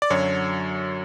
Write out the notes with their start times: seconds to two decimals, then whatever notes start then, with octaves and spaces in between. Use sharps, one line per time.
0.02 D5
0.10 F#2 D3 F#3 C#5